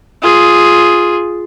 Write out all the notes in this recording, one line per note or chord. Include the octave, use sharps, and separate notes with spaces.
F4 G#4